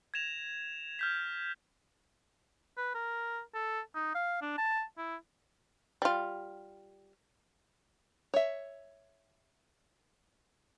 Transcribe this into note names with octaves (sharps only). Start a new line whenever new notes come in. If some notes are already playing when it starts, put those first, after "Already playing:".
G#6 A#6 E7 F7
F6 G6 B6
B4
A#4
A4
D#4
F5
D4
A5
E4
G3 F4
C#5 E5